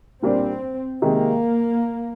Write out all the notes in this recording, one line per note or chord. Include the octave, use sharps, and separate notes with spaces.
A#2 G3 A#3 C4 D4
C3 D#3 G#3 A#3